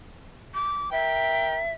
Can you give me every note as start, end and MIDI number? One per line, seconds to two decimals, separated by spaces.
0.54 0.90 86
0.92 1.63 70
0.92 1.72 76
0.92 1.63 79